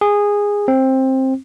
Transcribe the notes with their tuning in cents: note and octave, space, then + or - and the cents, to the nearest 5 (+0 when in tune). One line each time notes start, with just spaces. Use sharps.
G#4 -15
C4 +15